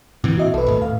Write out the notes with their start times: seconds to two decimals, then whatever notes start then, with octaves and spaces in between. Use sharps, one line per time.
0.24 A#2 E3 C4
0.37 F#4 D#5 E5
0.54 B1 A4 B4
0.67 D#1 A2
0.82 F5